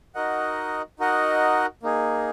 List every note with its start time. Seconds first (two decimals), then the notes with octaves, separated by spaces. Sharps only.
0.15 D#4 F#4 A#4 D#5 F#5
0.99 D#4 F#4 A#4 D#5 F#5
1.83 A#3 D#4 G#4